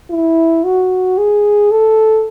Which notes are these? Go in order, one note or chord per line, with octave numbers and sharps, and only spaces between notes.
E4
F#4
G#4
A4